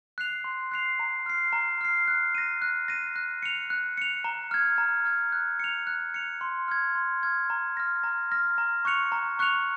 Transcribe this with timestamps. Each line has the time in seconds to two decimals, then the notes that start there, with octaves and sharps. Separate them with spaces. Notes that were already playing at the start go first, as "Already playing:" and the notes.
0.18 F#6 C7 F7
0.44 C6
0.72 F#6 C7 F7
0.99 A#5
1.26 F6 C7
1.53 A#5
1.81 F6 C7
2.08 F#6
2.35 A#6 D#7
2.62 F#6
2.88 A#6 D#7
3.16 F#6
3.43 C#7 F7
3.70 F#6
3.97 C#7 F7
4.24 A#5
4.51 F6 G#6
4.78 A#5
5.05 F6 G#6
5.32 F#6
5.60 C#7 F7
5.87 F#6
6.14 C#7 F7
6.41 C6
6.68 F6 G#6
6.95 C6
7.23 F6 G#6
7.50 A#5
7.77 F6 A#6
8.04 A#5
8.32 F6 A#6
8.58 A#5
8.85 C#6 F#6 C#7 F7
9.12 A#5
9.39 C#6 F#6 C#7 F7